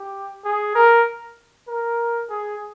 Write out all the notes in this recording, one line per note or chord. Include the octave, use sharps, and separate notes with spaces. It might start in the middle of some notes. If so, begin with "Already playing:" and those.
Already playing: G4
G#4
A#4
A#4
G#4